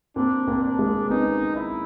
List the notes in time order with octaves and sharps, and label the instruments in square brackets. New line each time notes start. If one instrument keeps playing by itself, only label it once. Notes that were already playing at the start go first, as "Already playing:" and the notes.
[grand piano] A#3 C4 [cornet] D4
[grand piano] A#3 C4
[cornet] D4
[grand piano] G#3 A#3
[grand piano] B3 C#4 [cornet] D#4
[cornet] E4